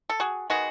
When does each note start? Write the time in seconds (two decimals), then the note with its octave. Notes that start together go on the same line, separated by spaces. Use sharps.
0.09 A4
0.20 F#4 G#4
0.50 D#3 G#3 B3 F#4 G#4